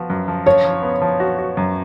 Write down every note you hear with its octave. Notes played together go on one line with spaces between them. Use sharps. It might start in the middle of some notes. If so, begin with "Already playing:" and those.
Already playing: F3 B3 F#4
F#2
F3
F3 C#5
F3
B3
F3
F#4
F#4
F#2